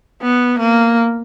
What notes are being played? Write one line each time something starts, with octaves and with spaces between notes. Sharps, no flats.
B3
A#3